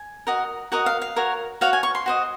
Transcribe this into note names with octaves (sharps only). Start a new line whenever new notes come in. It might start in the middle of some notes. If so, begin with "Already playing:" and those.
Already playing: G#5
F#4 A#4 D#5
F#4 A#4 D#5 F#5
F5
F5
F#4 A#4 C#5
F#4 C#5 F5
G#5
C#6
C6
F#4 C5 D#5